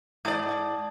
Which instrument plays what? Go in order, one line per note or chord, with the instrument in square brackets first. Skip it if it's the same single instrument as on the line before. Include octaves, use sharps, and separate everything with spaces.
[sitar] G#2 D5 [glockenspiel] A5 D#6 G#6